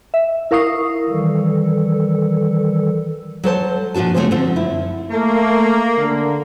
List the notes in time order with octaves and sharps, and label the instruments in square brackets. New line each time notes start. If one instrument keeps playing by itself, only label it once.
[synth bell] E5
E4 A#4 F5 C#6 D#6 C7
[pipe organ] D#3 E3 G3 A4
[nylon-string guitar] F#3 A4 C5 A5
A#2 F3 D4 F#4 A5
C#3 A3 A#3 C4 C#4 C5
D3 F3 C4
F#2 E4
[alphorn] A3 [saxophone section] A#3
[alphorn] D3